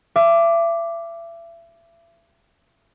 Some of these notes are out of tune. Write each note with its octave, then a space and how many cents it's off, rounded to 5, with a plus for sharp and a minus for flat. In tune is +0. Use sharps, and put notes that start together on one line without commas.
E5 +35 D6 +0